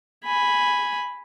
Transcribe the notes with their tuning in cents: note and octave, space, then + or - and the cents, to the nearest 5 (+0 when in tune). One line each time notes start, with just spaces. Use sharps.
G#5 +0 B5 +0